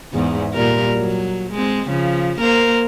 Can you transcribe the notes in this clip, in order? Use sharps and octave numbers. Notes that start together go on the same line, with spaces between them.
E2 G#2
A#2 G3 A#4
F#3
G#3 C4
C#3 F3
A#3 A#4 C5